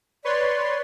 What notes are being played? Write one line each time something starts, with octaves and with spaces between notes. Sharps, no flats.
B4 C#5 D5 C6